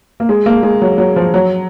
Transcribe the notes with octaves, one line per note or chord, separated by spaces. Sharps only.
A#3
G#3
A#3
G#3
F#3
F#3
F3
F#3